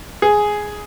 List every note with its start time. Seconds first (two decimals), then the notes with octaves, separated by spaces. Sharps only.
0.22 G#4